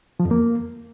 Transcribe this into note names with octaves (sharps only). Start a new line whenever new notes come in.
F3
F2
A#3